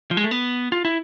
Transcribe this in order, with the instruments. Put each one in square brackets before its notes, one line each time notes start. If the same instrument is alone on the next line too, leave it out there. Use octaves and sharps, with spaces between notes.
[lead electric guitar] F3
G#3
A3
B3
F4
E4